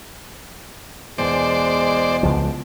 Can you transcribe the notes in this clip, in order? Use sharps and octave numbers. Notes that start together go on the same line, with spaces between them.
E2 B2 G#3 C5 D5
C#2 F3